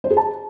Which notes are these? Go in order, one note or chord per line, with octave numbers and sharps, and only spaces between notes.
C5
G#4
A5